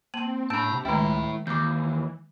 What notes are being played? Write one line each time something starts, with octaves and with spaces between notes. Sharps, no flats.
A#3 C4 A5 D#7 F#7
A2 C#4 D4 A5 B5 E6 G6 D7
C3
C#2 D#3 G#3 A3 C#4 E4 G5 A#5
D#2 E3 D6 G6